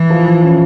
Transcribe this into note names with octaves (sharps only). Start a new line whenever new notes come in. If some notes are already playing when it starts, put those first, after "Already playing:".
Already playing: E3 E4
F3
C#4